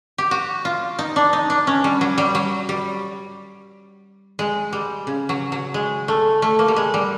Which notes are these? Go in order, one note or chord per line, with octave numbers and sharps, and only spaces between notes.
G4
F#4
F4
D#4
D4
D#4
D4
C#4
G3
F#3
G3
F#3
G3
G#3
G3
C#3
F#3
F#3
G#3
A3
A3
A#3
G3
G#3
G3